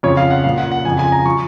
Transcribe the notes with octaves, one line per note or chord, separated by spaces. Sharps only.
F2 C#3 F3 C#5
F5
F#5
A#2 F3 F5
F#5
F#5
F2 C#3 F3 G#5
G#5
A#5
F3 C#6